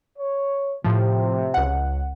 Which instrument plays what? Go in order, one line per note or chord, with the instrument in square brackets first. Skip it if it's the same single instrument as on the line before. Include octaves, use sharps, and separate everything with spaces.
[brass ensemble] C#5
[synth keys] A2 F3 [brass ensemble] C3
[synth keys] C#2 F#5